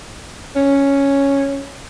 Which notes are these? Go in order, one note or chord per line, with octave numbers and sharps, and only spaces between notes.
C#4